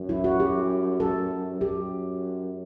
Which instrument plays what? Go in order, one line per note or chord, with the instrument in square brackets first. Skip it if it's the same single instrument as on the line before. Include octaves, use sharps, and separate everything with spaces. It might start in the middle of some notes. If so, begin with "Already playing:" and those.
Already playing: [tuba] F#2
[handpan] E4
F#4
G4
A4
[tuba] F#2 [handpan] G4